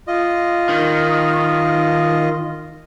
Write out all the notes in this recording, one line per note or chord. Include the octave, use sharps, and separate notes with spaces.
F4 D#5
D#3